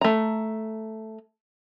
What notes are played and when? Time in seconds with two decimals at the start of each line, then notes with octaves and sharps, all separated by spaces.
0.01 A3 A#5